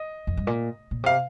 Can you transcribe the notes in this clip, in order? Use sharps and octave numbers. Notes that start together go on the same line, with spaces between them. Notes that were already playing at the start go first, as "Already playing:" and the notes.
Already playing: D#5
F2
G2
A#2
A#2
C3 F5